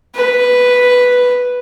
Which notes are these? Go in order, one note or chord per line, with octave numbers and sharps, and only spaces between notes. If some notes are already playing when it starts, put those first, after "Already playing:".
B4